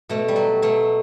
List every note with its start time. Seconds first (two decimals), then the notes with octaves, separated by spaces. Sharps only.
0.09 B2 A3
0.28 G3
0.36 F#3
0.62 B2 A3